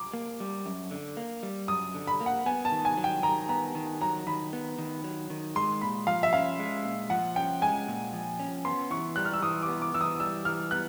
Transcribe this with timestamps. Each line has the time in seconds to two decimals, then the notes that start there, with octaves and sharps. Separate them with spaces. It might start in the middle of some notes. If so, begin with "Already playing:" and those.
Already playing: D6
0.14 A#3
0.40 G3
0.66 F#2
0.91 D3
1.17 A#3
1.43 G3
1.68 F#2 D#6
1.95 D3
2.07 B5
2.21 A#3
2.26 F#5
2.46 B3 G#5
2.65 A5
2.72 D#3
2.85 G#5
2.97 F#3
3.04 G5
3.23 D#3 A#5
3.49 B3 A#5
3.75 D#3
4.01 F#3 A#5
4.27 D#3 B5
4.53 B3
4.79 D#3
5.04 F#3
5.30 D#3
5.56 G#3 C6
5.81 A#2 B5
6.07 F3 F5
6.23 E5
6.33 C#4 F5
6.59 G#3
6.85 A#2
7.10 F3 F#5
7.36 C#4 G5
7.62 G#3 G#5
7.88 A#2
8.13 F3
8.40 C#4
8.65 B3 C6
8.91 E3 C#6
9.16 G3 F#6
9.25 F6
9.33 E6
9.42 E3 D#6
9.63 D6
9.68 B3
9.82 D6
9.94 E3 E6
10.01 D#6
10.20 G3 E6
10.45 E3 F6
10.71 B3 F#6